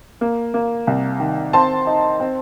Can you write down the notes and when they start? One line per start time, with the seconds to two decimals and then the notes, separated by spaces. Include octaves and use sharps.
0.21 A#3
0.54 A#3
0.87 C2
1.20 D#3
1.53 C4 A5 C6
1.87 D#4
2.20 C4